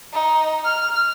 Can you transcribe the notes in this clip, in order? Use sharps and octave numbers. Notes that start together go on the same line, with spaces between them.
D#4
F6